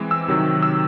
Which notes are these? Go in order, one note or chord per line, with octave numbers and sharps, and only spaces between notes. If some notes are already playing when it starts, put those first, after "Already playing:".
Already playing: E3 G#3 C4
E6
C3 D#3 F#3
E6